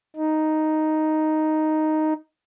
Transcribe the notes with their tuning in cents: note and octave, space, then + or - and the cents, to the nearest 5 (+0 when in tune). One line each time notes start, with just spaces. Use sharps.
D#4 +0